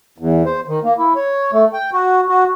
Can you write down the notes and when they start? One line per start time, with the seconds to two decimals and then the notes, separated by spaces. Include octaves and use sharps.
0.18 E2
0.45 C5
0.68 D#3
0.84 A#3
0.98 E4
1.16 C#5
1.53 A3
1.73 G5
1.93 F#4
2.28 F#4